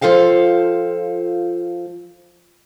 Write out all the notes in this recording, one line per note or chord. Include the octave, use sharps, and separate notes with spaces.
F3 F4 A4 F5 G5